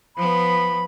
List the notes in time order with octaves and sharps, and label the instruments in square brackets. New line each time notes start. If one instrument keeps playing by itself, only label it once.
[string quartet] F3 B3 [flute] B5